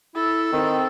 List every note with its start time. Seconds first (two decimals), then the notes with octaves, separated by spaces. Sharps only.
0.15 E4 A4
0.53 D#3 C4